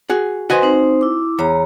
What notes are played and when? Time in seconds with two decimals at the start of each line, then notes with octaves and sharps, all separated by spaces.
0.10 F#4 G#4
0.50 F#4 B4 C5 D#5 G#5 C6
0.62 C4 D#4 C5
1.01 E4 D6
1.39 E2 C#5 A#5